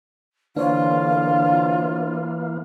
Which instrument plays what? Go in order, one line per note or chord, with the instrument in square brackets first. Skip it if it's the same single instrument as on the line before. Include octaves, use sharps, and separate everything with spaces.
[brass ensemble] D3 F5 [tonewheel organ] E3 A#3 [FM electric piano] D4 C5 C#5 [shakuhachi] F4